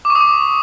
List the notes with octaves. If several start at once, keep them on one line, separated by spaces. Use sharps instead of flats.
D6
C#6
D#6
C#6